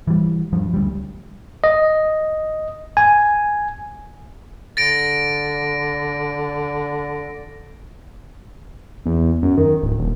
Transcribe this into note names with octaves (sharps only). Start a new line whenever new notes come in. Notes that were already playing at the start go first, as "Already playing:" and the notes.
E3 G3
G2 F3
D2 G3
D#5
G#5
D3 A6 A#6 D7
E2
F#2
D#3
D1
D#1